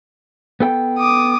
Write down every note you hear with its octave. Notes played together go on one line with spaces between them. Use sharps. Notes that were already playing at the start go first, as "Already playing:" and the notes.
B3 A4 G5
D6 D#6